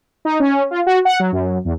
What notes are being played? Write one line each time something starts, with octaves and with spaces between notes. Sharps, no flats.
D#4
C#4
F4
F#4
F#5
F#3
F#2
E2